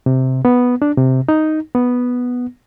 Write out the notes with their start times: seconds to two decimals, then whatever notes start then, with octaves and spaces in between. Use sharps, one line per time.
0.06 C3
0.45 B3
0.82 D4
0.97 C3
1.29 D#4
1.75 B3